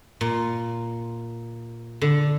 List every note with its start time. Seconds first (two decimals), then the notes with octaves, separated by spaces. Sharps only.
0.21 A#2
2.01 D3